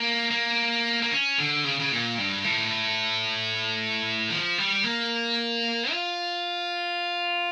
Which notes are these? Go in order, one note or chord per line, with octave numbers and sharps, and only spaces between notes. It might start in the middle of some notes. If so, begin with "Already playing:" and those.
Already playing: A#3
A#3
A#3
C#4
D3
C#3
C#3
A#2
G2
A2
F3
G3
A#3
F4